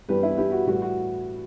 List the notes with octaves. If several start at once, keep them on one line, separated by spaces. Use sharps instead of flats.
G2 E3 G3 B3 G4 B4
E4 G4
E4 G4
F#4
A2 E3 G3 F#4
F#4